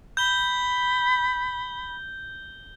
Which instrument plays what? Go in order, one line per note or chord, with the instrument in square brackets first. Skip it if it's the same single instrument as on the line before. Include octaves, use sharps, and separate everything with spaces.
[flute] B5 [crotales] G6 G7